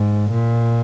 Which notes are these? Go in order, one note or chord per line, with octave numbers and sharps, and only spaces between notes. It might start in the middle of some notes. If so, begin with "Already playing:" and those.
Already playing: G#2
A#2